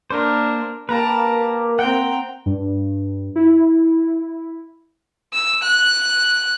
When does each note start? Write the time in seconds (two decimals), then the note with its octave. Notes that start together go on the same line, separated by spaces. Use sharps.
0.10 A#3 D4 A#4 C5
0.89 A#3 G4 A#4 B4 A5 A#5
1.79 C4 F#5 G5 A#5
2.46 G2
3.36 E4
5.33 E6
5.63 F#6